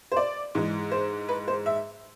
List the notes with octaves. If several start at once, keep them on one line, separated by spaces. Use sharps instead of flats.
C5
D5
G#2 E3 G#3
C5
B4
C5
E5